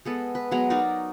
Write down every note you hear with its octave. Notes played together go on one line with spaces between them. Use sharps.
G#3 B3 A4
B4
F#3 G#3 B3 A#5
D#4 F#4 A#4 D5